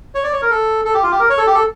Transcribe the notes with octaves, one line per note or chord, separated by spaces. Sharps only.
C#5
D5
C#5
A#4
A4
A4
G4
F4
G4
A#4
C#5
A4
G4
A4